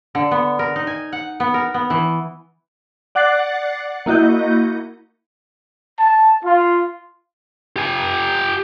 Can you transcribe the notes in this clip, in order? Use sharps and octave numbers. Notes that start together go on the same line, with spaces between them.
D3
B3
A#4
D#4
G#5
F#5
B3
A#4
B3
E3
D5 F#5 D6 F#6 A6 C7
A#3 E4 F#4 D#5 G6
A5
F4
G4 G#5